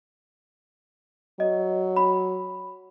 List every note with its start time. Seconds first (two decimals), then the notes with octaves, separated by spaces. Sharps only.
1.40 F#3 D#5
1.97 B5